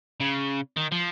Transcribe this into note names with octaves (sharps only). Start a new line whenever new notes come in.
C#3
D#3
F3